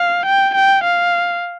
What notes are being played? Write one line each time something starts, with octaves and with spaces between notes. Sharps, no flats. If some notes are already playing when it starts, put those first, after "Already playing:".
Already playing: F5
G5
G5
F5